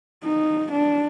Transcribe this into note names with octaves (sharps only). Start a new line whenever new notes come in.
D#4
D4